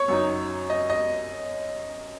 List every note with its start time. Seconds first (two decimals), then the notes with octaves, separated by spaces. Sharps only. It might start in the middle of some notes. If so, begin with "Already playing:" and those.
Already playing: C#5
0.08 F#2 F#3 D#4
0.70 D#5
0.90 D#5